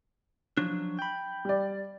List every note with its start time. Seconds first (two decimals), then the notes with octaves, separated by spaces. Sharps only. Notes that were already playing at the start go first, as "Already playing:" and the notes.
0.57 F3 F#3 D4
0.99 G5 B5
1.45 G3 D5